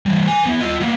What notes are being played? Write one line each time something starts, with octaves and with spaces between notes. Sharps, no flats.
E3 G3
B4 G#5
E3 B3
F4 D#5
A#3 B3